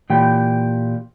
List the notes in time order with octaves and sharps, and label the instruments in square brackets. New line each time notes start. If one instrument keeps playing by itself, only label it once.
[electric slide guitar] A#2 E3 G4 G5